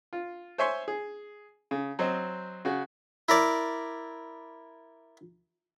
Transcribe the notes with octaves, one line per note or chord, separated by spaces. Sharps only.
F4
C5 C#5 E5 G#5 C6 C#6
G#4
C#3
F#3 C4 C5 D#5
C#3 F#4
E4 A#4 D5